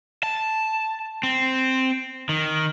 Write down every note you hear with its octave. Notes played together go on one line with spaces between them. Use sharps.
A5
C4
D#3